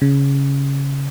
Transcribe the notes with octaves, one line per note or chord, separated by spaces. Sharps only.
C#3